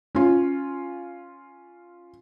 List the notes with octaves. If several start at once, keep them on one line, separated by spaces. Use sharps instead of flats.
C#4 F4